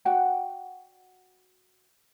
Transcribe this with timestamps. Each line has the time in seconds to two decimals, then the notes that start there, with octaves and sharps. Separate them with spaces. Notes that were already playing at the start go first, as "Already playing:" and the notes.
0.05 F#4 D5 F#5 G5